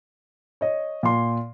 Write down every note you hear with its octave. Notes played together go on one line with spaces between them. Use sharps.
C#5 D#5
A#2 C6